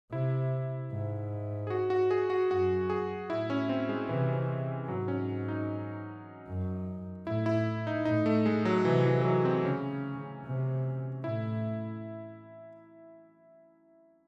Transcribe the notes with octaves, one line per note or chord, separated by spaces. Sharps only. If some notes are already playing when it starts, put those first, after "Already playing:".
C3 E4
G#2
G#4
F#4
F#4
G#4
F#4
F#2 F#4
G#4
A2 E4
C#4
C4
G#3
C3 E3
E3
G#2 F#3
C#4
D#4
F#2
A2 E4
E4
D#4
A2 D#4
A3
G#3
F#3
C3 E3
E3
E3
F#3
C4
C#3 C#4
C3
A2 E4